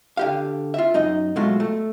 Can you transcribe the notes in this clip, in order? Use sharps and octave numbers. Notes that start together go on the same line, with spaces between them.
D3 G4 F5
F4 E5
F#2 D#4 D#5
B2 F#3 G#3 A3 F4
A3